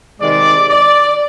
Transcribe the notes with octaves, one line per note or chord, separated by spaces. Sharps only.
C3 D#3 G#3 D5
D5